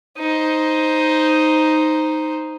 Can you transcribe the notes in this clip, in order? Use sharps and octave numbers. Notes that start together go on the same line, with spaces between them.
D#4 C5